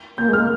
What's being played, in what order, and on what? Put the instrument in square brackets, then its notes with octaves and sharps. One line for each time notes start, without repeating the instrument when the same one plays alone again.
[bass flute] A#3 [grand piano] G6
[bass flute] G#3 [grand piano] F6
[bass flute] A#3